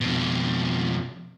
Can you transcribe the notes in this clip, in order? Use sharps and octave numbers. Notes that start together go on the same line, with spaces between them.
F2 B2